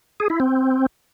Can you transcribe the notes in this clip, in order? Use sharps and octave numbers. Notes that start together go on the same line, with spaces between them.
G#4
E4
C4